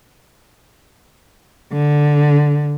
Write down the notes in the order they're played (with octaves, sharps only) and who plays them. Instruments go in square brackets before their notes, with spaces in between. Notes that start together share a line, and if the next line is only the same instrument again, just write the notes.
[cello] D3